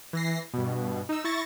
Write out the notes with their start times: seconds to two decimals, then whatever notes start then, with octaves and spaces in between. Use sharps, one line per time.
0.13 E3 A#6 C7
0.54 G2 B2
1.09 D#4 E6
1.24 E4 C#6 A6 A#6